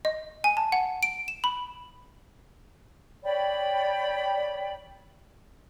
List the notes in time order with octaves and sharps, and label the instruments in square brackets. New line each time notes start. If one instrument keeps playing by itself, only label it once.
[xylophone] D#5
G#5
A5
F#5
D7
E7
B5
[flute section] C#5 D5 G5 B5